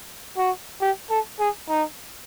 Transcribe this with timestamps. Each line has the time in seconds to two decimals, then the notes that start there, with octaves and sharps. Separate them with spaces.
0.37 F#4
0.81 G4
1.10 A4
1.40 G#4
1.69 D#4